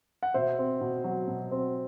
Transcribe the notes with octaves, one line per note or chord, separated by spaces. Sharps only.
F#5
B2 C5 E5
C4
B2
F#3
B2
C4